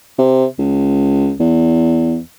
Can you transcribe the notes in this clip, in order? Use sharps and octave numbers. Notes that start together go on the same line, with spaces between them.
C3
C#2
E2